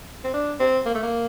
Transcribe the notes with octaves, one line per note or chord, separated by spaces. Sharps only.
C4
D4
C4
A#3
A3
A#3